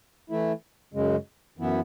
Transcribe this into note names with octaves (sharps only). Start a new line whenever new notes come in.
E3 A3 E4
F#2 C#3 G#3
F#2 E3 B3 E4